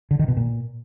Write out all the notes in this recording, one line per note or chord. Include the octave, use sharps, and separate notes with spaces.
D3
D#3
B2
A#2